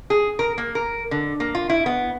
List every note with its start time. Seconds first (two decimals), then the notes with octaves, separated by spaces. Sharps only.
0.10 G#4
0.39 A#4
0.58 A#3
0.75 A#4
1.11 D3
1.40 A#3
1.55 F4
1.69 E4
1.86 B3